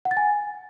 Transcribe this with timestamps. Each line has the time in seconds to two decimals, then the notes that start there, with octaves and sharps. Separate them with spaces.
0.05 F#5
0.11 A6
0.17 G#5